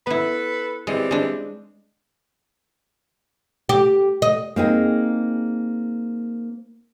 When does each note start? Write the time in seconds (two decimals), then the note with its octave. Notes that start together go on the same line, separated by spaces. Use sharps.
0.07 B3 E4 A4 B4
0.87 E3 G3 G#3 C4
1.11 G#3 D4
3.69 G4
4.22 D#5
4.56 A#3 C4 D#4 G#4